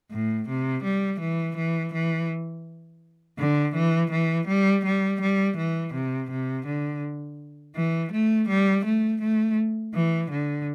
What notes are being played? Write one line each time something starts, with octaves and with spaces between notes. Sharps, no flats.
A2
C3
G3
E3
E3
E3
D3
E3
E3
G3
G3
G3
E3
C3
C3
D3
E3
A3
G3
A3
A3
E3
D3